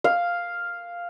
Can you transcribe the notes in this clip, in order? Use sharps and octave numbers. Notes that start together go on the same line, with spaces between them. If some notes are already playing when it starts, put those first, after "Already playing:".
F5